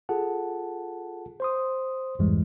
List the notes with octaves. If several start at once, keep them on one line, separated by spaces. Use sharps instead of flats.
F4 G#4 A4 F#5 A5
C5 C6 D#6
C2 F2 G#2 E3 G3 G#3